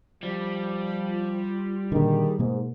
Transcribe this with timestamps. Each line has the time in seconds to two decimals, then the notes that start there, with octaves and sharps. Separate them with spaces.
0.23 F3 G3
1.09 F4
1.92 A#2 D3 D#3 G#4
2.39 G#2 B2 A#3